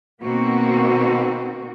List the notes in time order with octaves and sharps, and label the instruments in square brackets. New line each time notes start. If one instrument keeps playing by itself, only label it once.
[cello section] B2 D#3 A#3 C4 F#4